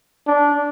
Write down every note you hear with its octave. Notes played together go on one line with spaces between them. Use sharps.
D4